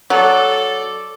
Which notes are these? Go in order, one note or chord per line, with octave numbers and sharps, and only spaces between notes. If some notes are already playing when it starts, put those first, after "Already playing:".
F#3 A4 D5